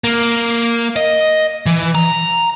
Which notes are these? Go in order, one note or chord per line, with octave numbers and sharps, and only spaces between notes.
A#3
D#5
E3
A#5